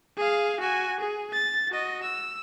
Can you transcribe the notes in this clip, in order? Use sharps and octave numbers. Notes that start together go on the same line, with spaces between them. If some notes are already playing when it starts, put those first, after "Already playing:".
G#4 F5
F#4 G#5
G#4
A6
F#4 D#5
E6